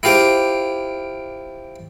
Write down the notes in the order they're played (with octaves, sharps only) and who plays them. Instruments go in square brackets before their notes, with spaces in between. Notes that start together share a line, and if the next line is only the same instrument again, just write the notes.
[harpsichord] E4 F4 G4 C5 D6